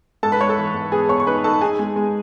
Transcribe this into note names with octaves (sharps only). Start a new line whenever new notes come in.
G#2 A4 A5
B4 B5
G#2 C#5 C#6
A4 A5
E3
G#2
B3 G#4 G#5
B3 C#5 C#6
C#6
D#4 B4 B5
D#4 A4 A5
D#4 G#4 G#5
G#3
G#3